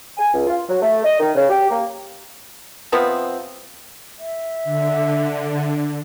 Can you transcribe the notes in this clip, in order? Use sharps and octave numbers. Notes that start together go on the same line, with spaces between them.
G#5
C#2
F4
F#3
A3
D#5
D#3
C#3
G4
A#3
C3 F3 B3 C4
E5
D3